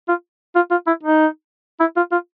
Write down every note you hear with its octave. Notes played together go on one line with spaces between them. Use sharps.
F4
F4
F4
E4
D#4
E4
F4
F4